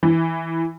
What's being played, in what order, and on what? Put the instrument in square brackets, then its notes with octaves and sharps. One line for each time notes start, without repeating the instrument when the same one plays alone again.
[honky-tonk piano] E3